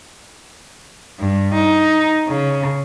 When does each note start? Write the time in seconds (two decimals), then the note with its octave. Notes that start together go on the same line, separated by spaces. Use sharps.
1.19 G2
1.54 D#4
2.28 C#3